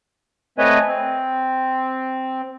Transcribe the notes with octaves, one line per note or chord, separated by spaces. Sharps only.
A3 C4 B4 C#5 D#5 G#5
C4